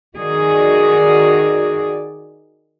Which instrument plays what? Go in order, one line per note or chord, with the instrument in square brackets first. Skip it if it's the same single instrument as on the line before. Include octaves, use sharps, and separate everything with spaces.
[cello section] D#3 F#4 G#4 D5